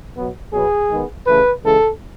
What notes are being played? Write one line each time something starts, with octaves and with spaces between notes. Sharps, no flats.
B2 F#3 B3
B2 F#3 B3 G#4
D#3 G#3 B3
C#3 E3 A3 B4
C#3 E3 G#3 A4